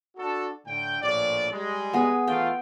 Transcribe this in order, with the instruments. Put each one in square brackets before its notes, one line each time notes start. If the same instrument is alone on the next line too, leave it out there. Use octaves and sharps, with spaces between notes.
[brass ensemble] D4 F#4 A4
A2 D3 G5
A#1 A2 D5
G3 G#3
[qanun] B3 G#4
[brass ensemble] E3 A3 F4 [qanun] G5